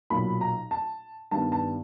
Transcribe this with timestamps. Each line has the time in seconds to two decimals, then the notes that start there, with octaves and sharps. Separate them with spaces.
0.10 B1 A#2 F#3 B5
0.41 A#5
0.71 A5
1.31 G2 D#3 G3 B3 A5
1.52 A5